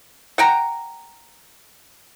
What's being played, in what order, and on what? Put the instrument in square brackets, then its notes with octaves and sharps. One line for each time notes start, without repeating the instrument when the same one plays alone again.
[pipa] F#5 G5 A#5